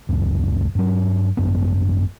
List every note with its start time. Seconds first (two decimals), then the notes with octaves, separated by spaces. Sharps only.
0.09 D#1 C#2 F#2
0.75 G2 F#3
1.37 G#1 F#2 B3